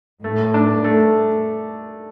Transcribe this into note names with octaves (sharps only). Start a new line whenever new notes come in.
A2 A3
D4
A3